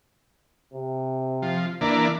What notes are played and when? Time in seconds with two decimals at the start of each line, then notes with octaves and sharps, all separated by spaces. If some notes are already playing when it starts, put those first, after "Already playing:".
0.74 C3
1.42 F3
1.81 E3 A#3 D4